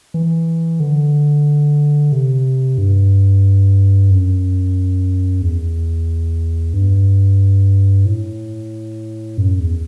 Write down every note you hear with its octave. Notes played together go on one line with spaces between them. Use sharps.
E3
D3
C3
G2
F#2
E2
G2
A2
F#2
E2